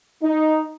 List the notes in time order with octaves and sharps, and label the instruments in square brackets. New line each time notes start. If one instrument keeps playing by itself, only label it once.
[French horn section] D#4